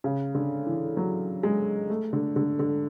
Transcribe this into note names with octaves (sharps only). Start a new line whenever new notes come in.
C#3
D3
E3
F#3
G#3
A3
D3
D3
D3